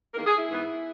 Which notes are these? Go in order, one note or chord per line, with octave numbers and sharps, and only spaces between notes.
E2 D#3 A#3 A#4
G#4
E4
G#2 E3 B3